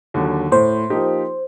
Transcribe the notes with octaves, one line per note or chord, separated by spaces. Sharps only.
D#2 D3 F#3
A2 C5
F3 A#3 D#4 G4